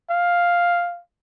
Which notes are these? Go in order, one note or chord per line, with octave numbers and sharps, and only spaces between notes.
F5